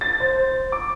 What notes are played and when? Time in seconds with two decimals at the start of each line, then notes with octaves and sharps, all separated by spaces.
0.01 A6
0.20 C5
0.72 D6